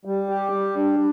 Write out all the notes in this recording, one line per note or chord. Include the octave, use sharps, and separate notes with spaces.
G3
G4
G3
D4